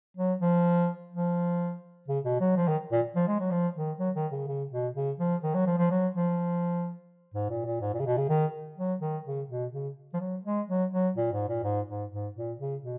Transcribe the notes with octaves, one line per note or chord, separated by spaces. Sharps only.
F#3
F3
F3
C#3
B2
F#3
F3
D#3
A#2
F3
G#3
F#3
F3
D#3
F#3
D#3
C#3
C#3
B2
C#3
F3
D#3
F#3
F3
F3
F#3
F3
G#2
A#2
A#2
G#2
A#2
C#3
B2
C#3
D#3
F#3
D#3
C#3
B2
C#3
F3
F#3
G#3
F#3
F#3
A#2
G#2
A#2
G#2
G#2
G#2
A#2
C#3
B2